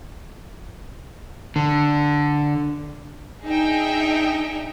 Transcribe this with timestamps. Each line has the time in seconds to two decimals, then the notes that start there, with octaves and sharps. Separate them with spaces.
1.56 D3
3.44 D4 D#4 G#4 D#5 E5 G5